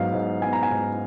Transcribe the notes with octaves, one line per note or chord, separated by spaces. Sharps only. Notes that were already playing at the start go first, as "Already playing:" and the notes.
Already playing: G#2 F#3 B3 F5
G#2
B3 G#5
A#5
G#5
G#2